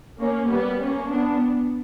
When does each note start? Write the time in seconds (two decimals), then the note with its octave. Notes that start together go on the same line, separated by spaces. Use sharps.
0.19 A#3 C#4
0.50 G3 B3
0.80 A#3 C#4
1.10 B3 D4